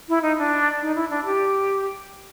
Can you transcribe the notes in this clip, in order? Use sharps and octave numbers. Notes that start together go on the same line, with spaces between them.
E4
D#4
D4
D#4
E4
D4
G4